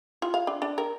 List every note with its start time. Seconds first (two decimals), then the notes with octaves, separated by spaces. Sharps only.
0.22 F4
0.34 F5
0.47 D4
0.62 D4
0.78 A#4